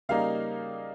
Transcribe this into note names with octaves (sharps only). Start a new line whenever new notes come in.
C#3 G3 A#3 D#4 F5